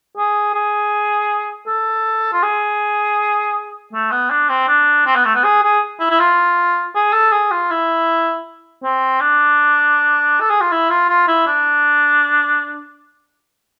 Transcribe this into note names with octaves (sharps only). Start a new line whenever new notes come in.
G#4
G#4
A4
F4
G#4
A3
B3
D4
C4
D4
C4
B3
A3
B3
G#4
G#4
E4
E4
F4
G#4
A4
G#4
F4
E4
C4
D4
A4
G#4
F4
E4
F4
F4
E4
D4